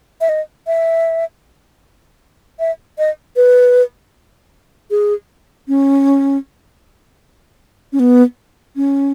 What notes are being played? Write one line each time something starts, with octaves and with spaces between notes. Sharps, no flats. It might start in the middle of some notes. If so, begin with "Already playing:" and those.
E5
D#5
E5
E5
D#5
B4
G#4
C#4
C#4
B3
C#4